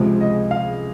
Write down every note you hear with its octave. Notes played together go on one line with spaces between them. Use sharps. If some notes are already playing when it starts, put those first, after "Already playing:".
Already playing: C#2 C3 F3 G#3
D#5
F5